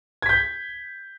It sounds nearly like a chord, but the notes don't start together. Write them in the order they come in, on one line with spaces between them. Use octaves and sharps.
G#6 B6 G6